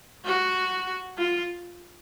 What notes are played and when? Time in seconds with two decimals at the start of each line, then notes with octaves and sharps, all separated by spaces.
0.25 F#4
1.18 F4